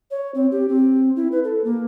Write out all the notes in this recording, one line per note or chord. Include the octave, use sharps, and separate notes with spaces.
C#5
C4
G4
C4
E4
B4
A4
A#3